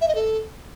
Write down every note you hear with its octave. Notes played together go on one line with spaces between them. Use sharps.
E5
D#5
A4